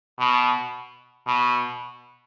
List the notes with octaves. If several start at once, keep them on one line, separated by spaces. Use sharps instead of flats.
B2
B2